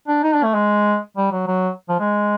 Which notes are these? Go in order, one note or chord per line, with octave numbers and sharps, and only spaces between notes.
D4
D#4
D4
A3
G#3
G3
F#3
F#3
F3
G#3